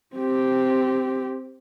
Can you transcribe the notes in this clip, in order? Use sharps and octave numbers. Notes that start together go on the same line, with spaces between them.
C4 G4